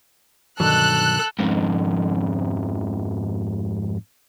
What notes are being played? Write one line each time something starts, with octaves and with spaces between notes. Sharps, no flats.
G2 B2 D3 D#3 F#3 A4 F#6
F2 G#2